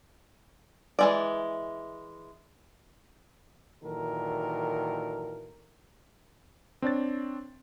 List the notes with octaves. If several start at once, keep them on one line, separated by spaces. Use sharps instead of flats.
E3 G#3 D5
A#2 D#3 E3 F#3 A4 A#4
C4 D4 C#5 A6